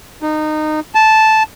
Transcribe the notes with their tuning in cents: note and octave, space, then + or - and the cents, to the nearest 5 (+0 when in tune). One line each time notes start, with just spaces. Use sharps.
D#4 -20
A5 -10